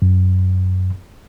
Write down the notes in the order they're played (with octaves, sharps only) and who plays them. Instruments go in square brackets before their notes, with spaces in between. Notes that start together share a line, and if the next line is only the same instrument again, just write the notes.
[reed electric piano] F#2